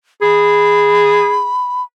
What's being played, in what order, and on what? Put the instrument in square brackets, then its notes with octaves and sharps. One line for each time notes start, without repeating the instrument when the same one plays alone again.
[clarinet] G#4 [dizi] B5